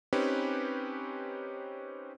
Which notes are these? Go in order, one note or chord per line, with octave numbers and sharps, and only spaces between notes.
C4 C#4 D#4 G4 B4